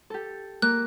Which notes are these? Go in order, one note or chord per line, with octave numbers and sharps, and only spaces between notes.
G4 A4
A#3 F#6